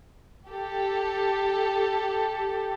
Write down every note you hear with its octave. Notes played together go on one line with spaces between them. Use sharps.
G4 A4